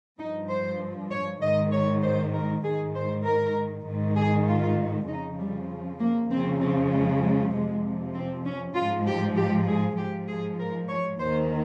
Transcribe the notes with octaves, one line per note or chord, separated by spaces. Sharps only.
G2 F3 D#4
C5
C#5
G#2 D#3 D#5
C#5
C5
A#4
G#2 D#3 G#4
C5
A#4
G#2 D#3
G#4
F4
F2 C#3 F3 D#4
G3
A#3
F2 C#3 F3 C4
C4
G#3
G#3
F2 C3 F3 G#3
C4
C#4
G#2 F3 F4
G4
G4
G#4
G#2 F3 G4
G#4
A#4
C#5
D#2 D#3 C5